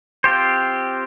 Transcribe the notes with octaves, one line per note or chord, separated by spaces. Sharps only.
C4 F4 G4 C5